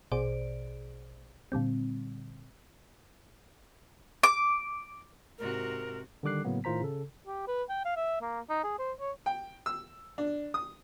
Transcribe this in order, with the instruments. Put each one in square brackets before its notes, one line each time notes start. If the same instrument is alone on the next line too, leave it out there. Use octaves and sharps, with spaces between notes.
[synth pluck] A#1 B2 G#4 C5 D5 D7
A#2 D3 G3 C4
[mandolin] D6
[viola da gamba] G#2 C3 F#4 [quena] A#4
[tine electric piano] D3 D#3 G3 D6 F#6 C7
A2 C#3 F#3 A#3 B3
A2 D#3 F4 C5 A#5 B6
C#3 A4
[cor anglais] G4
B4
G5
F5
E5
A#3
D#4
G#4
C5
C#5
[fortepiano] G5
E6
D4
D#6